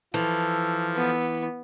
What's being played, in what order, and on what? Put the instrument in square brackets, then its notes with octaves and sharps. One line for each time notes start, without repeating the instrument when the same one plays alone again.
[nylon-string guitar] E3 [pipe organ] F3 [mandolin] A4
[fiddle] B3